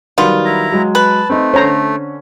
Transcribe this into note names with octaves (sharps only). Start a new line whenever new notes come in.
D#3 F#3 G3 B3 F4
E4 A#5
F#3 G#3
B4 A5
A3 C4 D#4
D3 C#4 C5 C#5 A#5